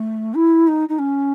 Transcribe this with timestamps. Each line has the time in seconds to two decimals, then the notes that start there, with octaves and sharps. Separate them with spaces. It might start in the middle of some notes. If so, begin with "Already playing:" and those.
Already playing: A3
0.34 E4
0.67 D#4
0.89 D#4
0.99 C#4